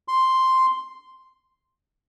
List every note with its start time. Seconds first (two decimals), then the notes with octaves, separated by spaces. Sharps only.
0.08 C6